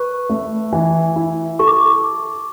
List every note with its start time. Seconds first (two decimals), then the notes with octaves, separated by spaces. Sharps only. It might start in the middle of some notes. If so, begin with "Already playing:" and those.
Already playing: B4 C#6
0.30 A3
0.73 E3
1.16 E4
1.59 A4 C#6
1.68 D6